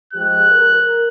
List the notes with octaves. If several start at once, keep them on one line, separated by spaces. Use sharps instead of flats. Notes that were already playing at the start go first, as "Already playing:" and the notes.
F3 G#3 G4 F#6
A#4